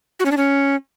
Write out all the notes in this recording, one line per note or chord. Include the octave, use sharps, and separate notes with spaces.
F#4
C#4
D4
C#4